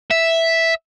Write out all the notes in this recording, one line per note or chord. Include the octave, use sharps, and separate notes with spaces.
E5